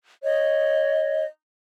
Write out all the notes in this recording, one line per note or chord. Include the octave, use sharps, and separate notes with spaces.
C#5 D#5